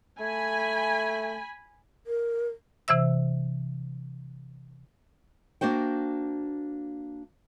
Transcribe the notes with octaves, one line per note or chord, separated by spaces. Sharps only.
A3 G#5 B5
A#4
C3 E3 C5 E5 E6
A#3 D4 F#4 C5 G5